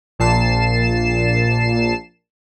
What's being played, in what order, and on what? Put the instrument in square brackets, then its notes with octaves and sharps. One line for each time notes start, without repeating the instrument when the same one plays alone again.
[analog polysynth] A#1 A#2 A5 C7 E7